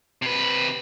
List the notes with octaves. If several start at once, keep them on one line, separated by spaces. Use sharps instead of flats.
C3 B4